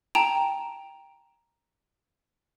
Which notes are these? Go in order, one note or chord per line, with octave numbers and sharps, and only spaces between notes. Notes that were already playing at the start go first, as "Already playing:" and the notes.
G5 A5 A#5 D7 F7